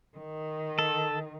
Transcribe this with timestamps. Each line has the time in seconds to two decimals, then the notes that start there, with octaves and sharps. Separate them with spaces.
0.18 D#3
0.79 A4